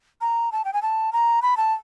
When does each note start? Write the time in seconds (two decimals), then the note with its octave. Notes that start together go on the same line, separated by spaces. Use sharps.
0.21 A#5
0.52 A5
0.65 G5
0.73 G#5
0.82 A5
1.13 A#5
1.42 B5
1.57 A5